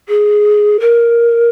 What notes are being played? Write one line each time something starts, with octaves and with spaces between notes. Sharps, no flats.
G#4
A#4